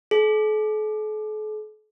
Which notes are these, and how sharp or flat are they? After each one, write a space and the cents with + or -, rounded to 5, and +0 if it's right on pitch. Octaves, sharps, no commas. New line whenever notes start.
A4 -45